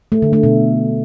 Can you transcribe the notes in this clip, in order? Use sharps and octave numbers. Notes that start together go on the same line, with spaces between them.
A3
D3
A3
B2